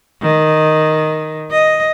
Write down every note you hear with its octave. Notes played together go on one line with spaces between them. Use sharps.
D#3
D#5